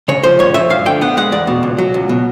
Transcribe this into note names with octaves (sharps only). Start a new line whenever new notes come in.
C#3 C#5
F3 C5
G2 C#5
F3 E5
G2 F5
D3 G5
B3 F#5
G#3 F#5
E2 D5
B2
C#2
F#3
C#2
B2